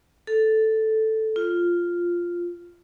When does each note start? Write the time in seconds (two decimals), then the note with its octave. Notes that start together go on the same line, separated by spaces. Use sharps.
0.27 A4
1.36 F4